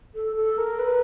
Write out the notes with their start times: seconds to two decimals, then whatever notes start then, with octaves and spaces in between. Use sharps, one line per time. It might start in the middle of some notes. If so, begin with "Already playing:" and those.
0.15 A4
0.36 A4
0.58 A#4
0.79 B4